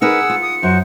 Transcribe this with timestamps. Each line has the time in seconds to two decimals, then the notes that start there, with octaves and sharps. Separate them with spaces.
0.02 D#4 G#4 A#4 B4 F#5 E6 C#7
0.30 F4
0.43 D#6
0.63 F#2 F#4 C5